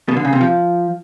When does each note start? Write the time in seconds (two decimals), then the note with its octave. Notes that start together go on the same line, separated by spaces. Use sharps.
0.08 B2
0.17 D3
0.25 C#3
0.33 C3
0.41 F3